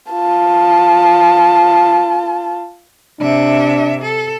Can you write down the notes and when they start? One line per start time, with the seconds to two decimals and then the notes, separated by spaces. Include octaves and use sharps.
0.11 F4 A5
3.21 C3 D4 E5
4.02 A4